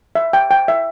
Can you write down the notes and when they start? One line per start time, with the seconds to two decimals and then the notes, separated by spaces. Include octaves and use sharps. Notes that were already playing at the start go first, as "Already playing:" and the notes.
0.15 E5
0.33 G5
0.51 G5
0.68 E5